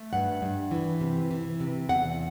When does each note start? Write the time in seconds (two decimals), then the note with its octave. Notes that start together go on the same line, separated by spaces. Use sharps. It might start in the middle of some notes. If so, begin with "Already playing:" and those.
Already playing: A3
0.13 G2 F#5
0.42 G2
0.71 E3
1.01 C3
1.31 E3
1.60 C3
1.89 E2 F#5